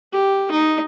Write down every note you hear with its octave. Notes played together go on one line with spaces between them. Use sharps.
G4
D#4